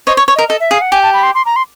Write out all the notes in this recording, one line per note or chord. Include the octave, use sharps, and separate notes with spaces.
C5 C#5 D#5
C#5
C#5
A#4 D#5
A4 D#5
E5
G#4 F5
F#5
G4 G#5
A5
B5
C6
C6
A#5
C6